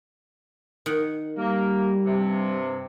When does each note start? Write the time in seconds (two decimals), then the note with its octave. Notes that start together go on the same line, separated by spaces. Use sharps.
0.86 D#3 F#5
1.37 G3 A#3
2.06 G2 C3